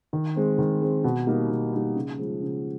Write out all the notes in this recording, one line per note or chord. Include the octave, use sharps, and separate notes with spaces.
D#3
G#3 C4
D#3
G#3 C4
B2
G3 A#3 D#4
B2
G3 A#3 D#4
C#3
F3 G#3
C#3